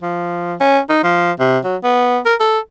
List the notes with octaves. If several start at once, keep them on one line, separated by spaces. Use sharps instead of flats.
F3
C#4
D#4
F3
C3
F#3
B3
A#4
A4